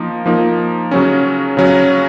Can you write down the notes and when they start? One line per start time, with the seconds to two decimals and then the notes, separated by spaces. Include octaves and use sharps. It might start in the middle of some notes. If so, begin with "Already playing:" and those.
Already playing: F3 A#3 D#4
0.26 F3 A#3 D#4
0.91 C#3 F#3 C#4
1.57 C#3 F#3 C#4